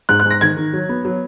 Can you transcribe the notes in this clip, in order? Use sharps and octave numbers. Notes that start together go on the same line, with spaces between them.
G#2 F#6
F#6
G#2
A#6
D#3 G#6
D#3
F#3
B3
F#3